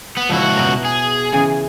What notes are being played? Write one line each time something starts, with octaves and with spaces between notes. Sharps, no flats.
B3
C#2 F3 E4 F#4
B2 A#5
G#4
C#3 E3 G#5